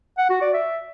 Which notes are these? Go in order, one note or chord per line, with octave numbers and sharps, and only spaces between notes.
F#5
F#4
D5
E5